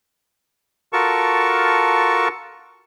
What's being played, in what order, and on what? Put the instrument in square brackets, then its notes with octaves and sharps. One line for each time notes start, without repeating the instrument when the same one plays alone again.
[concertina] F4 F#4 A4 A#4 A5 C#6